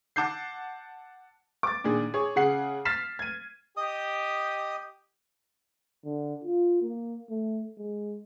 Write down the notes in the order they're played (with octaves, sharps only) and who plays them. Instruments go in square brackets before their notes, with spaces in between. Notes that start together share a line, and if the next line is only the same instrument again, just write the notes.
[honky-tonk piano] F#5 A5 D6 G6 C7
[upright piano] D6 A6
A#2 D#3 D4 G#4
G#4 C#5
C#3 G#4 F#5 C7
F6 A6 B6 C7 E7
G#6 D#7
[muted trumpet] G4 [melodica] D#5 D#6
[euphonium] D3
F4
A#3
A3
G#3